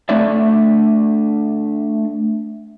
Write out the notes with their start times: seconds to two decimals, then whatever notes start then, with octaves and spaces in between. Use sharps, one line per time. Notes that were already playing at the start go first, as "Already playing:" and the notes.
0.09 A3 D4 D5 E5